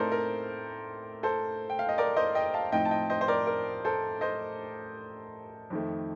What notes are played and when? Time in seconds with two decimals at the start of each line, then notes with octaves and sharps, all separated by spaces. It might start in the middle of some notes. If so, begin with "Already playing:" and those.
Already playing: A2 A3 C4 D#4 A4 A#4 C5 D5
0.12 A#4
1.23 A4 C5
1.70 G5
1.79 F5
1.89 D#5
1.98 A#4 D5
2.16 C5 D#5
2.35 D#5 G5
2.54 F5 A5
2.72 A2 F3 C4 D#4 D#5 G5
2.85 A5
2.91 D#5 G5
3.10 C5 D#5
3.21 C5
3.28 A#4 D5
3.47 A#4
3.85 A4 C5
4.21 C5 D#5
5.70 F2 D#3 A3